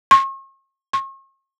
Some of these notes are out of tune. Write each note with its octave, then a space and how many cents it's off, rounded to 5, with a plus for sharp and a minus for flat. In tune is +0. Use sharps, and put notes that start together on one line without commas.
C#6 -45
C#6 -45